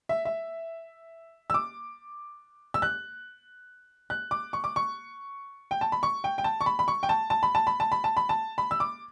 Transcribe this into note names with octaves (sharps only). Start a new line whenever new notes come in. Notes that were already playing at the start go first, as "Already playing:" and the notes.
E5
E5
E6
D6
E6
F#6
F#6
D6
C#6
D6
C#6
G5
A5
B5
C#6
G5
G5
A5
C#6
B5
B5
C#6
G5
A5
A5
B5
A5
B5
A5
B5
A5
B5
A5
B5
E6
D6